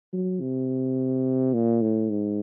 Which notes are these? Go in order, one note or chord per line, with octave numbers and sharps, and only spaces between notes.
F#3
C3
A#2
A2
G#2